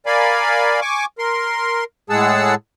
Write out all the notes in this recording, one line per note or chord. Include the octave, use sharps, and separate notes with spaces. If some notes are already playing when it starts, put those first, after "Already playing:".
A#4 D5 F5 G#5 B5
G#5 C#6 D6
A#4 C6
A2 G#3 G#4 F#5 A5 E6